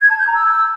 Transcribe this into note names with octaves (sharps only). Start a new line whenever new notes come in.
G#6
A5
G6
A#5
E6